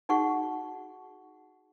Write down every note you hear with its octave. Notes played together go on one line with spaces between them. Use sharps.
D#4 F#4 G#4 F#5 C#6